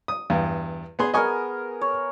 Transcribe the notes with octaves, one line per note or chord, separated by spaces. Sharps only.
D#6
E2 G2
B3 G#4 C6
B3 G#4 A#4 D#5 G#5 C#6
C#5